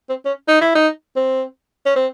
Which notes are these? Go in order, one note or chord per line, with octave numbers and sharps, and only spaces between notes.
C4
C#4
D#4
E4
D#4
C4
C#4
C4